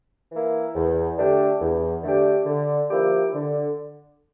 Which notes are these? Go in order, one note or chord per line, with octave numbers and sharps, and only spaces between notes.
E3 A#3 E4
E2
D3 A3 D4 G4
E2
D3 A3 D4 G4
D3
F3 A#3 E4 G4
D3